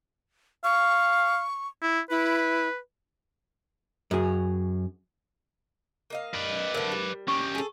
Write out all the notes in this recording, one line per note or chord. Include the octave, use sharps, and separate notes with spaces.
F5 C#6
E4
E4 B4
F#2 G#4
A#3 D#5 F5
B4 D5
D3 A3 A#4 C5
G3
C#4 G4 C#6
G#4 A4